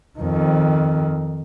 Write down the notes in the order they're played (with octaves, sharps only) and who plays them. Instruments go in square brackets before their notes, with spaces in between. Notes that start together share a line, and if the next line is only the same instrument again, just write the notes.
[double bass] F2 D#3